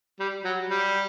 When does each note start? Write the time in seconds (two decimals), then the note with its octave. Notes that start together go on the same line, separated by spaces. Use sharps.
0.19 G3
0.44 F#3
0.70 G3